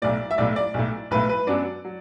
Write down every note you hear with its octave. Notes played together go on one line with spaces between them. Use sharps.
B1 A2 A3 D5
E5
B1 A2 A3 D5
D5
B1 A2 A3
B1 A2 A3 B4
B4
F#2 F#3 B3 D4 D5
F#3